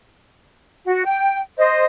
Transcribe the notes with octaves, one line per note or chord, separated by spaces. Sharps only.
F#4
G5
C5 D#5